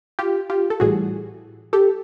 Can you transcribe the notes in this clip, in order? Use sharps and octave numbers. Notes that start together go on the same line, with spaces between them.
F4 G4
F4 G4
A4
A1 A2 E3 G3 F#4 G#4
G4 A4